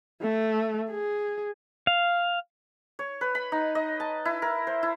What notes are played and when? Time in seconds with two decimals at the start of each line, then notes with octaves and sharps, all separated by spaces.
0.22 A3
0.91 G#4
1.87 F5
2.99 C#5
3.21 B4
3.35 B5
3.52 D#4
3.75 D#5
4.00 A5
4.25 E4
4.42 A#4
4.67 C5
4.83 E4